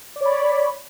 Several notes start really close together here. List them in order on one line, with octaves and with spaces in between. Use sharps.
D5 C#5 B5